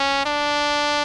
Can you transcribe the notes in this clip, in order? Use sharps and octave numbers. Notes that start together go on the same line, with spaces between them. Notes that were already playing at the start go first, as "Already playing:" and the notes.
Already playing: C#4
D4